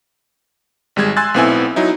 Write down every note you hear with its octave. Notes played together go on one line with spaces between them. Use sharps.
G#1 G3 G#3 G#6
G#5 C6 E6 F#6 A6
B1 A2 B3 C4 E4 G#5
F#3 D#4 E4